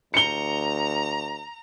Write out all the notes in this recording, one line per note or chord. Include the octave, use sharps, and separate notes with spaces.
D2 A#5 C#7 G7